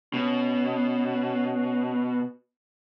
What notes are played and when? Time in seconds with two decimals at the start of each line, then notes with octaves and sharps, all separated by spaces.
0.14 B2 C#4